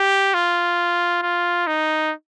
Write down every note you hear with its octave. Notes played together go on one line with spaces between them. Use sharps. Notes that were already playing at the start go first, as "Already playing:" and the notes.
Already playing: G4
F4
F4
D#4